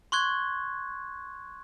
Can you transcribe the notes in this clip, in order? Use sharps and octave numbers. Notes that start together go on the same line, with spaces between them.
C6 C#6 F#6 G#6